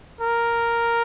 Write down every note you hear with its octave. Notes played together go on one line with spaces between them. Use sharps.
A#4